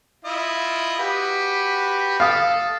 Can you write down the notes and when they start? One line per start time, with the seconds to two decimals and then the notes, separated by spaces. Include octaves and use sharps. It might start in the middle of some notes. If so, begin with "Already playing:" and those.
0.25 E4 F4 D#5
0.99 F#4 G4 B4
2.20 A4 F5 D#6